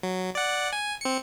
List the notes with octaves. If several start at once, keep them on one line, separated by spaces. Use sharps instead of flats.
F#3
D5 F#5
G#5
C4 C#7